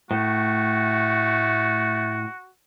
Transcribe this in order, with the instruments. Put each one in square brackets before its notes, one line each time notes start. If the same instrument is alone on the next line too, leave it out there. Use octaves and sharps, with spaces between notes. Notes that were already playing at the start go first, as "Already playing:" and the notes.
[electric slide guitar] A2 [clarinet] A3 [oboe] F#4